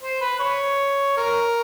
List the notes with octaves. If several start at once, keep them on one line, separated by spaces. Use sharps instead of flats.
C5
B4
C#5
A#4